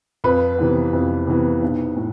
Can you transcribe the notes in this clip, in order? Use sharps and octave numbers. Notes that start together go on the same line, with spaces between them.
F2 B4
C3 E3 B3
F2
C3 E3 B3
B1
A2